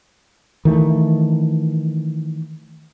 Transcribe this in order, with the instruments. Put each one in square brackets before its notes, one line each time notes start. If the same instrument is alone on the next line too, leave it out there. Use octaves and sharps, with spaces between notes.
[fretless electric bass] D#3 E3 G#3 A3